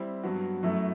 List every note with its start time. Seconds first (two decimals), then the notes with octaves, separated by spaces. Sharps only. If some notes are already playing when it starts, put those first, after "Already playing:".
Already playing: G3 C4 E4
0.23 G2 F#3 B3 F#4
0.63 F#2 F#3 A3 E4